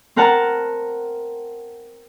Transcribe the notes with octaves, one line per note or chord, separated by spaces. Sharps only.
C4 A#4 F#5 A5 A#5